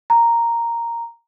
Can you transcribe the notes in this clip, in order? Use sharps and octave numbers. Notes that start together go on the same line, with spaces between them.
A#5